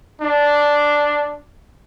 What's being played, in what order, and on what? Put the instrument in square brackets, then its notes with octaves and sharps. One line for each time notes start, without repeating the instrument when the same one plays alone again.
[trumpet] D4